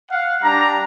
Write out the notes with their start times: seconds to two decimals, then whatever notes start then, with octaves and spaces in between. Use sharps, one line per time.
0.11 F5 F#5
0.43 G3 D4 A#5